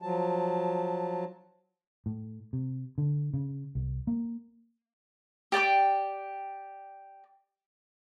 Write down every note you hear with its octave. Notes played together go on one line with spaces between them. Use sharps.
F3 F#3 A5
A2
C3
D3
C#3
C2
A#3
G4 D5 G5 D6